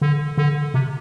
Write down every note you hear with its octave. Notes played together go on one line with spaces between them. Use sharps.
D3
D3
C3